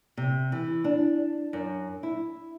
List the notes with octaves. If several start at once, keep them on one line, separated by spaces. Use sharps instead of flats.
C3
E3
D4
F#2
E4